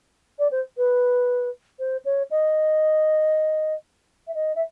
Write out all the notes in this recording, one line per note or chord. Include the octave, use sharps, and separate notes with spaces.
D5
C5
B4
C5
C#5
D#5
E5
D#5
E5